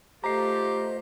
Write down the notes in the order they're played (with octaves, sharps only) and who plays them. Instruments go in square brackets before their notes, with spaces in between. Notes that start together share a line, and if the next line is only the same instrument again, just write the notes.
[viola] A3 F4 [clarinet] G4 [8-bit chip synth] C5 D#5 [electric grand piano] A#5 C7